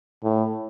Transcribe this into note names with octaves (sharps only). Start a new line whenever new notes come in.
A2